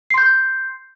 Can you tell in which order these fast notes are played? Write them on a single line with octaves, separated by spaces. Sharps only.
C7 C6 G6